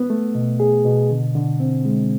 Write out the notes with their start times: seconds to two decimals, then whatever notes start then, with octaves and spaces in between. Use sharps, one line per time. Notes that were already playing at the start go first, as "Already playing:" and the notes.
Already playing: B3
0.10 A3
0.35 B2
0.60 G#4
0.85 B2
1.11 D3
1.35 D3
1.60 C4
1.85 G#3